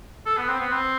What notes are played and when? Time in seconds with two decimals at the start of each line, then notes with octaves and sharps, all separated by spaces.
0.26 A4
0.37 B3
0.48 C4
0.60 B3
0.72 C4